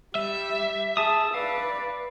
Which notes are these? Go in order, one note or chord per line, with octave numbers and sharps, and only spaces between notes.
G3 E5
G#4 A5 D#6
B4 D5 F5